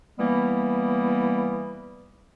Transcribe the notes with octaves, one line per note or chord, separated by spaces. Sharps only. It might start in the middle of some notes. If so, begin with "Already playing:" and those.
E3 G3 A#3 B3